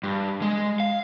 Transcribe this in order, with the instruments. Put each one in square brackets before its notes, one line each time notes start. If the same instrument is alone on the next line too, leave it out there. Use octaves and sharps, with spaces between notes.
[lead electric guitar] G2
G#3
F5